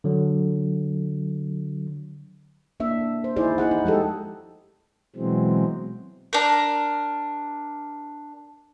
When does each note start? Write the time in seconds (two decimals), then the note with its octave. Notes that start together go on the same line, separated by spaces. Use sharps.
0.04 D3 F#3
2.80 A#3 D4 E5
3.24 C5
3.36 D#4 E4 G#4 C5 D5
3.58 D#4 E4 G#4 F#5
3.71 D#4
3.84 F3 G#3 G4 A4
5.16 B2 E3 F#3 G#3 C4
6.33 D4 A#4